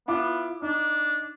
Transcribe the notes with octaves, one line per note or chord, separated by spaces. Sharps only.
B3 E4 F4 D6
D4 D#4